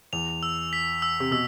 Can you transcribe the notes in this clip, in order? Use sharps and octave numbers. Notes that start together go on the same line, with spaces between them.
E2 F7
E6
B6
E6
C3
B2 E6